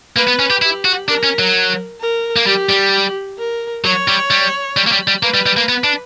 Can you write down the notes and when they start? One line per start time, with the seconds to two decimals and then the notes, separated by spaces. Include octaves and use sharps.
0.16 A#3 B4
0.28 B3
0.39 C#4
0.50 G4
0.62 E4 G4
0.85 F#4
1.08 D4 A#4
1.24 C#4
1.39 F#3
2.01 A#4
2.36 A#3
2.46 G3 G4
2.69 G3
3.38 A#4
3.84 F#3 C#5
4.08 G3
4.31 G3
4.77 G3
4.86 A#3
4.92 G3
5.08 G3
5.23 A#3 B4
5.34 G3
5.46 G3
5.57 A#3
5.69 B3
5.84 D4